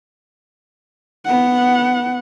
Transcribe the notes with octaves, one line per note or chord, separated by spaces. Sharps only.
B3 F#5